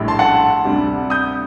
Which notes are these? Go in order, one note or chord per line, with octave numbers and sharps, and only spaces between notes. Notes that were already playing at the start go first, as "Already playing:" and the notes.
Already playing: A#1 A2 G3
A5 C6
F#5 A5
D2 C3 G3 D4
D#6 G6